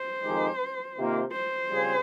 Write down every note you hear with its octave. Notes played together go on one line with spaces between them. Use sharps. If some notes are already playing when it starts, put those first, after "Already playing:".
Already playing: C5
F2 D#3 G#3 D#4 G4
C3 D#3 A#3 F4
C5
C#3 G3 C4 F4 G#4